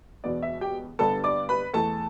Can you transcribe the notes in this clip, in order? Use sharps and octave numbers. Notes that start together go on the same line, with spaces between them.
E1 E2 B2 B3 D5
E5
G4 G5
G2 D3 G3 B3 A4 A5
D5 D6
B4 B5
E2 E3 A3 A4 A5